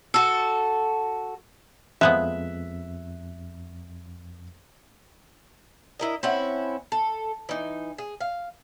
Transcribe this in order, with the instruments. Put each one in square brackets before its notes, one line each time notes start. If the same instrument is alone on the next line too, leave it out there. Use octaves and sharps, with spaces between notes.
[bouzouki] F#4 A4
[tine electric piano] F2 [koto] F3 G#3 B3 [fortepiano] E5 F#6
[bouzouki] E4 A#4 D#5
C4 C#4 E4 F#5
A4
E3 D#4
G#4
F5